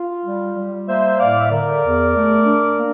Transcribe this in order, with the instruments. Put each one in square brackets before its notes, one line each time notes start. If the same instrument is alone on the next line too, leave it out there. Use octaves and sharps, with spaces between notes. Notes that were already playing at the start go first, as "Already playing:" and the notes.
Already playing: [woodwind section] F4
G3
G3
A#3 C5 E5
A2 D5 F5
E5
D3 A#4 D5
E2
A3
D4
A#3